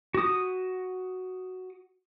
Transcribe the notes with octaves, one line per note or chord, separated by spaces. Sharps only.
F#4 D#6